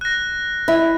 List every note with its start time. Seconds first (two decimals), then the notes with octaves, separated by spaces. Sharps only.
0.01 F#6 A#6
0.68 E4 E5